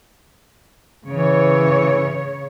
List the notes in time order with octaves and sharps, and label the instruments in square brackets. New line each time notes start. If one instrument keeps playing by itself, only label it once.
[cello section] C#3 C#5 [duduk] E3